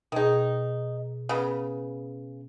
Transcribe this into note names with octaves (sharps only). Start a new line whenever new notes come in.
B2 D#3 D#4 G#4
C#3 B3